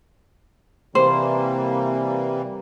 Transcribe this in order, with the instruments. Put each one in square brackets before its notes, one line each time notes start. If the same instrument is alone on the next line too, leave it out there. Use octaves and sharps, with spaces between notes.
[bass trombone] C3 [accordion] E3 G3 A#3 [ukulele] C5